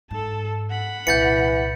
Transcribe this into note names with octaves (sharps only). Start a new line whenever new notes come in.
G#2 A4 A5
F#5 B5
C2 A#2 E3 G6 A6 C#7